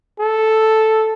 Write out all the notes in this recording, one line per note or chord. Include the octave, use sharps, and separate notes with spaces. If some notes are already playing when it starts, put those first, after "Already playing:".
A4